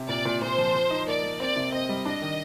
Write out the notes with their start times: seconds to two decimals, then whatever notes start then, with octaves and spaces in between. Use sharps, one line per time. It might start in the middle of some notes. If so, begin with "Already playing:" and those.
Already playing: C3
0.09 A#2 D5
0.25 A#2
0.41 A#2 C5
0.58 F3
0.74 F3
0.91 D#4
1.07 A#3 D5
1.23 A#3
1.40 C4 D5
1.56 C3
1.72 C4 D#5
1.89 G3
2.05 D4 D#5
2.22 D#3